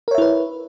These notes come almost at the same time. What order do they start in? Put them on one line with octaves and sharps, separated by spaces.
A#4 C#5 E5 E4 B4